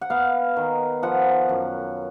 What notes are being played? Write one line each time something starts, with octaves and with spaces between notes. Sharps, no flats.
F#5
B3 F5
D#3
F3 F#5
F#2